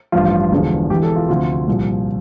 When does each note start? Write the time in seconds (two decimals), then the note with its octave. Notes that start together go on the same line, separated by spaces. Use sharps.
0.12 A1 G2 F3 F4
0.51 E1 E2 D3 F3
0.90 E1 E2 E3 G4
1.03 A4
1.16 F4
1.29 D2 C3 F3 F4
1.68 C2 A#2 F3